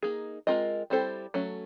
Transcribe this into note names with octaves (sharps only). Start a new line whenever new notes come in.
A#3 D#4 G#4
G#3 C4 F4 A#4 D#5
G3 C4 E4 A4 C5
F#3 A3 C#4